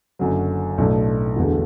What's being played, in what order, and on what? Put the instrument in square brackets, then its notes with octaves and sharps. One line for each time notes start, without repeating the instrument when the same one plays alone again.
[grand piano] F#1 F#2 D3 F#3
B1 A2 A3 D4
E1 E2 D3 A3